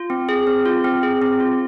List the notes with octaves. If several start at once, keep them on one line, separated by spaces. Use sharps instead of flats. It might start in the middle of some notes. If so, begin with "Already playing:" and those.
Already playing: F4
C4
G#4
C4
F4
C4
G#4
C4
F4